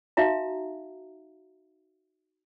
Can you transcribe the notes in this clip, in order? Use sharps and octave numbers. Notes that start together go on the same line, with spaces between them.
D#4 F#4 E5 F5 A#5